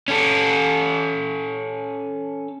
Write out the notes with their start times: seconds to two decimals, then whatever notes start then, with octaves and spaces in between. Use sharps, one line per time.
0.08 C#4 A4